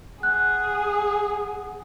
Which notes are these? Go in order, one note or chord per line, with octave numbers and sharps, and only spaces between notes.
G#4 F#5 F#6